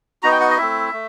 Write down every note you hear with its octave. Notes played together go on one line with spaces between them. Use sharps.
B3 D#4 F#4 A#5
G5
F#5
D#5
A3 C4 E4 E5
A3